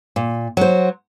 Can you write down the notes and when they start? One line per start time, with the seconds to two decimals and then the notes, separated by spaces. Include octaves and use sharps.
0.16 A#2
0.57 F#3 C5